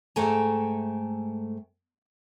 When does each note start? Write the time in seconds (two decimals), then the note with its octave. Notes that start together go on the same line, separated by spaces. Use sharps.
0.16 G#2 A3 A4 G5 G#5 A#5